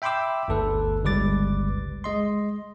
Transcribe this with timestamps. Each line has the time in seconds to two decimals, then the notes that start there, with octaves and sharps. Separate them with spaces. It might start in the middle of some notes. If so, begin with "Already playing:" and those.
0.02 E5 G5 B5 C6 D6 E6
0.48 G1 D2 A4 B4
1.03 G1 C#2 G3 B4 D6 A6
2.04 G#3 D#5 C6